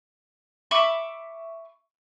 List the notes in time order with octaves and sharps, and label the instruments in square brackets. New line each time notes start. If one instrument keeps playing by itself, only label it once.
[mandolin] E5 B5 C#6 D6